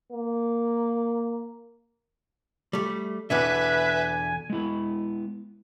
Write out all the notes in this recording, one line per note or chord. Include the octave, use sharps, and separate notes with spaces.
A#3
G3 A3
E2 B2 D3 B4 E5 G#5
G#3 B3 E4 B5